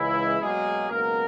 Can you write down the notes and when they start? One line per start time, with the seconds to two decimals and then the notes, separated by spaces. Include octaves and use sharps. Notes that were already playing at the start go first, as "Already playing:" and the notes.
Already playing: C#2 C#3 E3 G#3 E4
0.40 B2 F#3 G#3 A#3 G#4
0.90 C#2 B2 F#3 A#3 B3 A#4